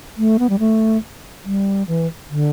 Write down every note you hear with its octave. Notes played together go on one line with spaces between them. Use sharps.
A3
B3
G3
A3
G3
E3
D3